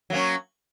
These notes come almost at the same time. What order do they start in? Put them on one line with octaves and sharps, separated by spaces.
F#3 A#3 C#4